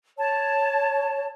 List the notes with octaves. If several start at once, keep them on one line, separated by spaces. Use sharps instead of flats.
C#5 A5